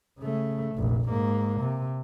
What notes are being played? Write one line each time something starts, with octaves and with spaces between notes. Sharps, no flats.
C#3 A3
F1 A#1
G#2 A#3
C3